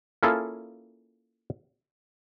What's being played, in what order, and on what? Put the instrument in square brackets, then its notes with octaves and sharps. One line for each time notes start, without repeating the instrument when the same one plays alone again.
[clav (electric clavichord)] A#3 C#4 E4 F4 G#4 A4